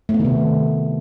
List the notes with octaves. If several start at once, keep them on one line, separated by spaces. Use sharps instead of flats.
A3
B3
D#3
C3